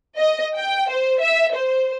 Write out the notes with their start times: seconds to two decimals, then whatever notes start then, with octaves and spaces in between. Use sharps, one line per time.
0.16 D#5
0.55 G5
0.90 C5
1.20 E5
1.55 C5